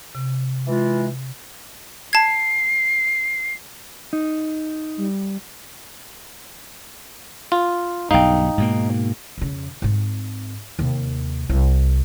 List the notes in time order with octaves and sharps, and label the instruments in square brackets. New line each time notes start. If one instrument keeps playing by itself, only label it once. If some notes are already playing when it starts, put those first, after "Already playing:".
[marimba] C3
[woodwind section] E3 G#3 F4
[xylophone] A5 G#6 [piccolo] C7
[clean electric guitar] D#4
[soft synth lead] G3
[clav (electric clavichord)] F4
[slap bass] B1 G2 [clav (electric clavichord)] D#4 [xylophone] F5 G5
[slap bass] G#2 B2 A#3
[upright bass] F2 C#3
G#2 C4
D#2 C3
C2